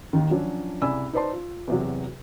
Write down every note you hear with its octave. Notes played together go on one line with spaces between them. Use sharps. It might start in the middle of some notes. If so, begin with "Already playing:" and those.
D#2 D#3
F3 F#3 C#4 D4
C2 C#3 D5 G#5 B5 E6
D#4 B4 C5 D5 A5 C6
F4
E2 C3 F#3